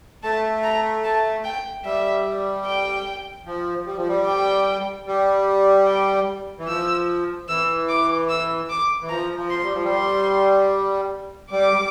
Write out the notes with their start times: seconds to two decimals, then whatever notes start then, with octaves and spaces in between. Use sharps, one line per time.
0.23 A3 A5
0.64 A#5
1.04 A5
1.44 G5
1.85 G3 E5
2.65 G5
3.46 F3
3.86 G3
3.97 F3
4.08 G3
4.26 G5
5.07 G3
5.87 G5
6.59 E3
6.68 F3 E6
7.48 E3 E6
7.89 D6
8.29 E6
8.69 D6
9.02 E3
9.10 F3 A#5
9.36 F3
9.50 C6
9.64 G3
9.74 F3
9.84 G3
9.90 C6
11.51 G3 D6
11.73 G3